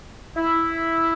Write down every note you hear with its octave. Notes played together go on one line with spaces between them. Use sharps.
E4